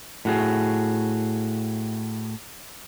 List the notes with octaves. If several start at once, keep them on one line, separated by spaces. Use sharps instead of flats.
A2 F#4 G#4